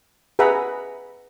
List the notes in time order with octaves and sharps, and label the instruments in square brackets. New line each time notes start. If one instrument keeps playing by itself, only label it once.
[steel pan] G#4 B4 E5 F#5 A#5 B5